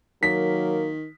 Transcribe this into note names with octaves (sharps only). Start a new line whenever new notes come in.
D#3 F#3 A#3 B6